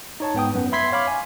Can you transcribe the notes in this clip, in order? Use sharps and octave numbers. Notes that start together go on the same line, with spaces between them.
D#4 C#5 A5
G#2 B3 G5 D#6
F#2 B3
E5 B5 C6 G#6 B6 C7
C#5 F5 B5 D6
G#5